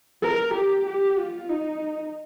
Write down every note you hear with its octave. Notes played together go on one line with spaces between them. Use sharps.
A#4
G4
G4
F4
D#4